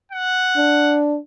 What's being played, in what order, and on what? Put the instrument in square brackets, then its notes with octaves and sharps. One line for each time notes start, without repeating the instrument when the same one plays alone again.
[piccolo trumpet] F#5
[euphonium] D4